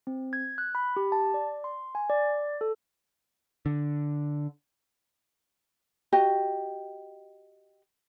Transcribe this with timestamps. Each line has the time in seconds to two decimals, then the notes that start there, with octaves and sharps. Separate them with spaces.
0.07 C4
0.33 G#6
0.58 F#6
0.75 B5
0.96 G4
1.12 A5
1.34 D5
1.64 C6
1.95 G#5
2.10 D5
2.61 A4
3.66 D3
6.12 F#4 G4 D#5